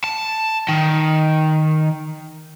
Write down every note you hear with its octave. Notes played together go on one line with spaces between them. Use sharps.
A5
D#3